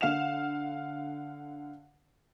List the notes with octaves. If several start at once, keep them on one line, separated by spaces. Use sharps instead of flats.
D3 F5 F#5 E7 F7